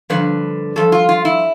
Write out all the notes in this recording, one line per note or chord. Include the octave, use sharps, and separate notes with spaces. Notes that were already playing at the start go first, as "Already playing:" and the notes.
G2 D3 F3 B4
G2 F3 A4
F4
F4
E4